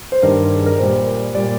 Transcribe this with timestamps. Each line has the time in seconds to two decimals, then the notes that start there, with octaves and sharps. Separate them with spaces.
0.12 C5
0.22 G2 D#3 G3 A#4
0.56 G#4
0.66 A#4
0.78 A#2 G3 C5
1.35 A#2 G3 D5